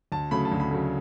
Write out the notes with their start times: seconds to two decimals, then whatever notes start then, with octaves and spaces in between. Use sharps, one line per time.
0.12 D2 A5
0.31 C#3 F#3 A3 B5
0.45 A5
0.52 D2
0.60 B5
0.71 C#3 F#3 A3